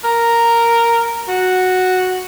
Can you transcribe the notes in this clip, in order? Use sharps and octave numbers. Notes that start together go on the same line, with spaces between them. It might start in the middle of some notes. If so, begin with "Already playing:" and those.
A#4
F#4